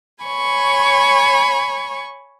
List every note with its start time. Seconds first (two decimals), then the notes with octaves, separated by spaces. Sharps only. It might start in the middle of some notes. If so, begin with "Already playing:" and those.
0.24 C#5 G#5 B5 C#6